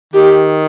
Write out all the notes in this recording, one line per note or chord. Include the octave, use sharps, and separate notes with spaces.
D#3 G4